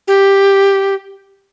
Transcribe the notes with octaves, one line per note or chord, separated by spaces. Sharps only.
G4